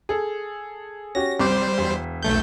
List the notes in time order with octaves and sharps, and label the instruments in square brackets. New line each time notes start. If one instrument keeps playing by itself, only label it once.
[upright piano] G#4 A4
[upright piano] C#4 F#4 G4 [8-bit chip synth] A#6
[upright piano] C2 D6 [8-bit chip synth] G3 C5
[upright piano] E1
[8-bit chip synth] B1 A3 G6